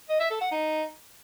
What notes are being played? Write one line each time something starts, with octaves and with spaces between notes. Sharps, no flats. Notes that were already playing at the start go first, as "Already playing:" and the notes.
D#5
E5
A4
F#5
D#4